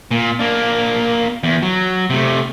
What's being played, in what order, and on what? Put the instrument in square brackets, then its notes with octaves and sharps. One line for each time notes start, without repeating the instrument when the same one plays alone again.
[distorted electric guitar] A#2
A#3 D4
E2
F#3
C3 A3